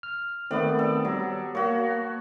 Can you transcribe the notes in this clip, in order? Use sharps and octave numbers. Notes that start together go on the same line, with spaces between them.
F6
D#3 A3 B3 C4 D5
A4
F#3 G3
A#3 F#4 C#5